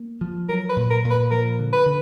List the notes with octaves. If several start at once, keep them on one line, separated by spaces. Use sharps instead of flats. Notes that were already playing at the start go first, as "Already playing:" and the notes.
Already playing: A#3
F3
F#3 A#4
B4
A#2
A#4
A#2
B4
F3 A#4
D3
B4
D3